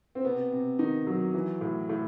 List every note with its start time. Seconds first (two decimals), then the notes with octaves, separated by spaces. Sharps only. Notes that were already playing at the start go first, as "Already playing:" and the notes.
0.15 C4
0.25 C3 B3
0.52 C3
0.79 D#3 D#4
1.07 F#3
1.34 E3
1.61 A2
1.89 A2